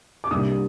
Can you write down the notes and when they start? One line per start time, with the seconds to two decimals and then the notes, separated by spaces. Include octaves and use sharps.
0.24 D6
0.31 C2 C3 G3 A#3 D4 D#6